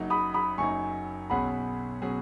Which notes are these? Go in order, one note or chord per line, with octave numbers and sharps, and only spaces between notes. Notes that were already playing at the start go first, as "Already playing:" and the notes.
Already playing: F#1 F#2 F#3 D#4
B5 D#6
B5 D#6
F#1 F#2 F#3 D#4 G#5 C#6
B1 B2 F#3 C#4 G#4 F#5 B5
B2 F#3 C#4 G#4